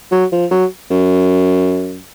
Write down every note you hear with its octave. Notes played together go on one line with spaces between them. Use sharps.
F#3
F3
F#3
F#2